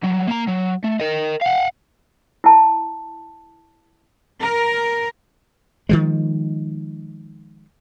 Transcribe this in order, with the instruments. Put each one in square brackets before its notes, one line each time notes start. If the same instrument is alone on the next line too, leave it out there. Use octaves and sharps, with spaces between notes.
[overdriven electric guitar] F#3 G3
A#3 A#5
F#3
A3
A#4 D#5
F5 F#5
[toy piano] E4 A5
[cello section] A#4
[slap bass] D#3 F3 G#3